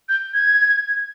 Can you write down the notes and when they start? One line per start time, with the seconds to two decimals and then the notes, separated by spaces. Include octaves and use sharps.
0.09 G6
0.34 G#6